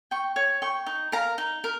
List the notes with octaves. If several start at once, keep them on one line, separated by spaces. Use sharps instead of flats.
G5 C#6
C#5
G5 C#6
D#4
A#4 F5 A#5
D#4
A#4